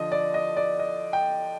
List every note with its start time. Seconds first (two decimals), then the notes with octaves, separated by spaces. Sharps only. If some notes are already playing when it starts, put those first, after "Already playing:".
Already playing: D3 F3 D#5
0.12 D5
0.34 D#5
0.57 D5
0.79 D#5
1.13 G5